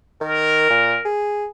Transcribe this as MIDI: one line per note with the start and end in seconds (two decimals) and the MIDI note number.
0.21 0.70 51
0.21 1.09 70
0.70 0.96 46
1.05 1.47 68